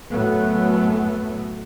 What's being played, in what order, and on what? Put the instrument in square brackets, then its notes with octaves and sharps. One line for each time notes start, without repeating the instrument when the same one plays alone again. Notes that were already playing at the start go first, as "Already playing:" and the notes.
[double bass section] F#2 A2 F#3 A3 B3